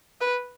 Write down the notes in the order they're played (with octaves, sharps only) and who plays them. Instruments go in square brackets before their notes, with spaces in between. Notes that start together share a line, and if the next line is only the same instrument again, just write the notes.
[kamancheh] B4